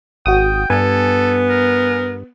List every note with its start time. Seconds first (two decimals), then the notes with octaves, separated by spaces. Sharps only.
0.26 G#1 F#4 G5 D#6
0.70 G2 B3 A4 G#5
1.49 A#4